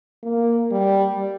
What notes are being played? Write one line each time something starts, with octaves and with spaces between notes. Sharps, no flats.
A#3
G3